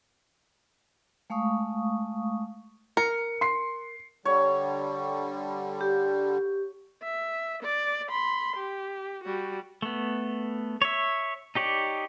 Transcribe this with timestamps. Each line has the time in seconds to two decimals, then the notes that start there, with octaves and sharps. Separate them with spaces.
1.30 G#3 A3 F5 C#6 D#6
2.97 A#4 C#7
3.41 C6 C7
4.25 D3 G3 C#5
5.81 G4
7.03 E5
7.63 D5
8.10 B5 C6
8.56 G4
9.24 G3 F#4
9.82 A3 B3
10.82 C#5 E5
11.55 D#4 G4 C#5 D5